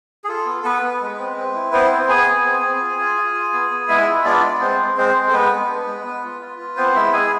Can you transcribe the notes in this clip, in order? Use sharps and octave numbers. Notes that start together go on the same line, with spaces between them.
G#4
F4 A4
B3
B3 B4
B3
G#3
C4
C4
E4
B3 C4 C5
B3
B3 G#4 G#5
B3
C4
C4
F4
F4
F4
F4
B3
B3
G#3 E4 E5
F4
B3 D4 D5
G#3
G#3 C4 C5
G#3
G#3 C4 C5
G#3
A4
G#3 B3 B4
G#3
D4
G#3
B3
F4
F4
F4
B3 C4 C5
G#3 E4 E5
G#3 G#4 G#5